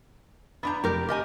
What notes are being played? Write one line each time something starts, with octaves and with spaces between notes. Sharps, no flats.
B3 D4 A#5 B5 G6
F1 G4 A#4
G4 D#5 G#5 F6 G6